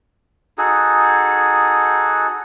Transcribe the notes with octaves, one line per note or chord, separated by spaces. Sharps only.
D#4 F#4 G#4 A4